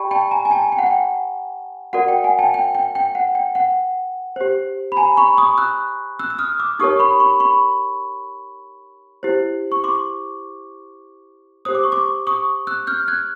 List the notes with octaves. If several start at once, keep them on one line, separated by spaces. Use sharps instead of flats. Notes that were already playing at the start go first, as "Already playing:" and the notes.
Already playing: G4 D5 G5 A5 B5 C#6
G5 A5
G#5 A#5
G#5
G5 A5
G5
F#5
G5
F#4 A#4 D5 F#5
G5
F#5 G#5
G5 A5
G5
G5
G5
F#5
G5
F#5
G4 C5
B5
G#5 A#5
B5 C#6
C#6 D#6
E6 F#6
E6 F#6
E6
D#6 F6
D6 E6
D#4 G4 A#4 C#5 C#6 D#6
B5 C#6
B5 C#6
B5 C#6
E4 G4 C5
C#6
C6 D6
G4 C5 D#6
D6
C#6
C6 D6
C#6 D#6
E6 F#6
F6 G6
F#6 G#6